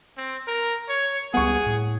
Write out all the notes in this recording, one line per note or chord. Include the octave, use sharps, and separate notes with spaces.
C4
A#4
C#5
C#2 G3 B3 G#4 F#5 C#6
A2